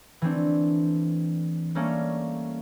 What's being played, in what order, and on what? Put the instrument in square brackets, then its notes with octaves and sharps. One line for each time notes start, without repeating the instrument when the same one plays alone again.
[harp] E3 A3 C4 D4
G3 A3 A#3 C#4